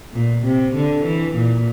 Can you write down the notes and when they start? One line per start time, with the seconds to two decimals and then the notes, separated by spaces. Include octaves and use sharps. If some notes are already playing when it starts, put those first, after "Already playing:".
0.13 A#2
0.44 C3
0.74 D3
1.04 E3
1.35 A#2